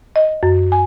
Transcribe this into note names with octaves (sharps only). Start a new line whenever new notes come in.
D#5
F#2
G#5